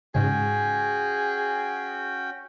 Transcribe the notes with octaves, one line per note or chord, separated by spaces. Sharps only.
G#2 C#3 C#4 F#4 G#4 G5